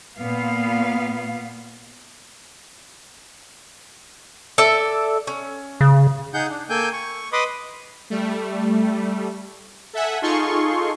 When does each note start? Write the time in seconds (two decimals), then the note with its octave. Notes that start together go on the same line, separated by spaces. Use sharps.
0.16 A#2 B3 F5
4.58 A4 D5 E5
5.27 C#4
5.81 C#3
6.34 D#4 G#4 F#5 G6
6.50 D4
6.69 A#3 A4 G5 G#5 G6
6.93 C#6
7.33 B4 D#5 B5 C6 D6 D#6
8.10 G3 A3
9.93 A4 E5 F#5 G#5
10.22 D#4 F4 G#4 A4 C6 C#6